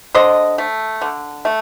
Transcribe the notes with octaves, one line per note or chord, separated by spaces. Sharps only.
D3 C5 D#5
A3
D3
A3